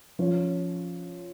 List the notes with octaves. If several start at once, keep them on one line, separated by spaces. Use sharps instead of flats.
F3 C#4 F4 C#5